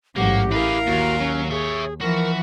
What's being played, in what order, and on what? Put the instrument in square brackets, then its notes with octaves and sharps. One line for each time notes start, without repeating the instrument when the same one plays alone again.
[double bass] A1 G#2 [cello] F#3 F#5 [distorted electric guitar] A#3 [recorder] G4
[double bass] E4 [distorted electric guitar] G#4 B4 [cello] A#4 F5
[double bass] D#2 [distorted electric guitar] A#2 [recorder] F#4
[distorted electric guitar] F#3 [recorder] C#4
[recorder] G#4 [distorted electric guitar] C#5 E5
[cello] E3 F3 [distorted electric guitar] F#4 [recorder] A#4